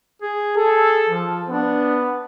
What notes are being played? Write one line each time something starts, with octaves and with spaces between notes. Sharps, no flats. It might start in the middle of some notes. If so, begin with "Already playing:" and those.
G#4
G#4 A4
F3
B3 D4